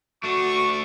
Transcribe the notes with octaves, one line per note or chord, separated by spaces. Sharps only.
A3 D4 F#4 C#6